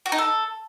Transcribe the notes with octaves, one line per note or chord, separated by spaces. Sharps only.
F#4
D#4
A4